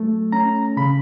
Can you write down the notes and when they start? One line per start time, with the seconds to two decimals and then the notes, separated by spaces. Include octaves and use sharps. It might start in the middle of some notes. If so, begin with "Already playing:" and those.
Already playing: F#3 A3
0.32 C#4 A#5
0.77 C#3 B5